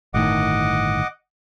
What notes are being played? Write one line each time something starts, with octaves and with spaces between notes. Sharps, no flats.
G1 A2 D#3 D#5 F#5 D6